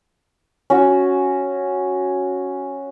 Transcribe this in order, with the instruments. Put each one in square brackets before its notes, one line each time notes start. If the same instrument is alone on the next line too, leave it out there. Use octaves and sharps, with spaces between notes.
[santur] C#4 F#4